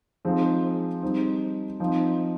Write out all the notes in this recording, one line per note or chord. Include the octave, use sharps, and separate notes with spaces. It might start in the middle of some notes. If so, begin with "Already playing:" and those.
F3 G#3 C4 D#4
G3 C4 D#4
F3 C4 D#4